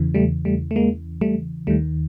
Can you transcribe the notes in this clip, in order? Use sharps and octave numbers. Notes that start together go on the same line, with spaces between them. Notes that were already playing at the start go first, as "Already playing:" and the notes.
Already playing: E2 C#3 E3
G3 A3
G3 A3
A3
G#3 A#3
G3 A3
D#2 D#3 G3 A3